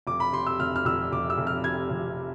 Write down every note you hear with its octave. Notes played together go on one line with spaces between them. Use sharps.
F1 D6
B5
C3 C6
E6
F1 F6
F6
F1 E6
F1 D6
E6
F1
F6
C3 G#6
F1